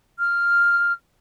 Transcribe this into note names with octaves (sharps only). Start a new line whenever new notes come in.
F6